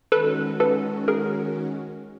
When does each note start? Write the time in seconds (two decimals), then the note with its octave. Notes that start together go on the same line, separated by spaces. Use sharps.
0.12 D#3 G#3 C#4 F#4 A4 B4
0.60 A4 B4
1.08 G#4 A#4